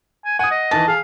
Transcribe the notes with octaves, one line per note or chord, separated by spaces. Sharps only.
G#5
F#5 G#5 D#6
D#5
E2 D#3 E3 A5
G#4 F5